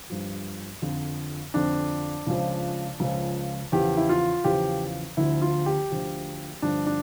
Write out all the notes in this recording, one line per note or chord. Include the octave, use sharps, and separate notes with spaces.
G2 F3
F2 D3 F3
F2 D3 F3 D4
C#2 C#3 F3
C#2 C#3 F3
E2 C#3 F3 G4
E4
F4
E2 C#3 F3 G4
D2 D3 F3 E4
F4
G4
D2 D3 F3
G2 D3 F3 D4
D4